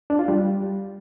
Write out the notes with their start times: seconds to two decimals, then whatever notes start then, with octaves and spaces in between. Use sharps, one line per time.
0.10 D4
0.19 F4
0.28 G3